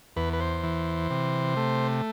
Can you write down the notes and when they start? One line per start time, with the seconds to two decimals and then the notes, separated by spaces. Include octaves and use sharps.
0.17 E2 B4
0.33 B4
0.40 C5
0.63 E3
1.10 C3
1.57 A3